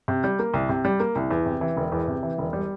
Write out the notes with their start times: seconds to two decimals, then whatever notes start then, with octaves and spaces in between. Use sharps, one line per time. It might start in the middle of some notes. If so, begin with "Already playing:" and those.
0.08 C3
0.24 G3
0.39 A#3
0.54 C2
0.69 C3
0.85 G3
1.00 A#3
1.15 C2
1.31 E2
1.46 C3
1.61 E3
1.77 E1
1.92 E2
2.08 C3
2.23 E3
2.38 E1
2.53 G3